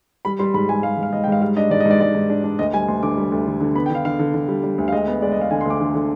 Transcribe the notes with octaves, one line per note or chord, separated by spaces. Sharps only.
G3 B5
G3 C6
G#2 B5
G3 G#5
G3 F5
G#2
F5
G#2 D#5
G5
G#2 F5
G3 F5
D4 D#5
G#2 D5
D#5
G#2 D5
G#2 D5
G#2
D4
D4
D2 D#5
G3 G#5
D2 C6
D3 D6
G3
D2
D3
D3
B3 B5
G5
D3 F5
D3 F5
D3
D3
G3
G3
D2
F5
G#3 D#5
B3
G#3 D5
D#5
G#3 F5
D3 G#5
C6
D2 D6
D3
D3